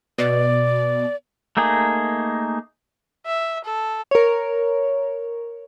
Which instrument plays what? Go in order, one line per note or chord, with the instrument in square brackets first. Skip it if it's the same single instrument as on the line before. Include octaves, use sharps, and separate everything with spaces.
[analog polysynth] B2 [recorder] D5
[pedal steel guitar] A3 A#3 D#4 G#4
[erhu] E5
A4
[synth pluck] A#4 C#5